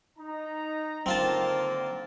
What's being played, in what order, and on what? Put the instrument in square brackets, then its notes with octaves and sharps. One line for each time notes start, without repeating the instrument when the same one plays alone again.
[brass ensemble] D#4 A#5
[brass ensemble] D3 D#3 A#3 [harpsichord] C4 F4 A5